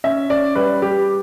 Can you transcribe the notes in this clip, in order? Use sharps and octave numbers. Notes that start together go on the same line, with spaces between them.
C#4 E5
C#4 D5
G3 B4
G3 G4